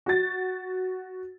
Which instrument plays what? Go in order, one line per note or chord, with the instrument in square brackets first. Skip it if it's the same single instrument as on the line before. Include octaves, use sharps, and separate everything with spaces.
[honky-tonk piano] F#4 A6